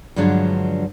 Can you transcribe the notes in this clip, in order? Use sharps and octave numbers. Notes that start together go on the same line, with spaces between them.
G2 D3 F3 F#3 G#3 D4